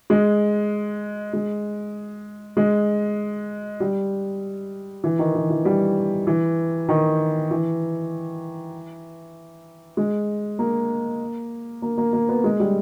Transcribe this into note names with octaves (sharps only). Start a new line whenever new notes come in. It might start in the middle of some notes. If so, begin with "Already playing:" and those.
G#3
G#3
G#3
G3
E3
D#3
E3
E3
G3
E3
D#3
E3
G#3
A#3
A#3
A#3
A#3
B3
G#3
G3